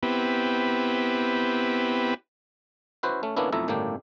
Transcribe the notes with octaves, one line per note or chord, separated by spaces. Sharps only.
B3 C4 E4 G4 B4
C#4 E4 F#4 B4 C5
A3 C#4
D3 A#3 B3 C#4 D4 E4
B1 F2 A3 E4 E5 A#5
G1 A2 C#3 A#3 D4 G4